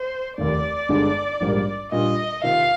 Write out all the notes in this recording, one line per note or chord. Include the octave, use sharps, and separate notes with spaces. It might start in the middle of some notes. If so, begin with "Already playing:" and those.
Already playing: C5
F1 D#2 D#3 D5
G1 G2 D3 G#3 D#4
A#1 G#2 G3 A#3
A#2 G3 D4 F4 D#5
C3 D#3 A#3 F4 F5